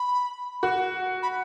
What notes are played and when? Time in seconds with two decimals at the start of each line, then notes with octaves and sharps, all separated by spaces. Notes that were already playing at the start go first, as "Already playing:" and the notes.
Already playing: B5
0.63 F#4
1.23 B5